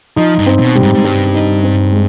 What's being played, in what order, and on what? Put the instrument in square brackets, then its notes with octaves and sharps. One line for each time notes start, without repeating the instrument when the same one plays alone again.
[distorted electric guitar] F3 [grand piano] D#4
[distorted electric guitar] G2
[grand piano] C4
[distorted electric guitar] B2
[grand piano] G3
[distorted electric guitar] G#2
G#2
[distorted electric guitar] G2 [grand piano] G3
[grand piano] D#4
C4
G#3